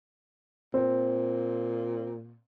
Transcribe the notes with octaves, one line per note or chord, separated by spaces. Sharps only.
A#2 C4